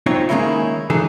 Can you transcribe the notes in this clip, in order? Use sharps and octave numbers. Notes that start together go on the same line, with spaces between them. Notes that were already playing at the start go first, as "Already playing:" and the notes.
C4 D#4 F4 C#5
D#3 G#3 A#3 C#4 D#4 E4
D#3 E3 D#4 G#4 A4